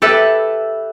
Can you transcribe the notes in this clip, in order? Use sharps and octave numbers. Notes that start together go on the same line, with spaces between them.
G4 A4 B4 E5